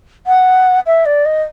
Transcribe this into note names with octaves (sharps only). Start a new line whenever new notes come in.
F#5
E5
D5
D#5